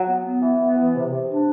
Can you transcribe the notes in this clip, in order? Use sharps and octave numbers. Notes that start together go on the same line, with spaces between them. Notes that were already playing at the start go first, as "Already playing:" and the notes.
Already playing: F#3
B3
B3
E3
B3
E3
C3
C3
D4